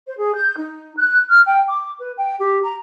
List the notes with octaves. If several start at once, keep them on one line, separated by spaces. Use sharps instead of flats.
C5
G#4
G6
D#4
F#6
F6
G5
D6
B4
G5
G4
A#5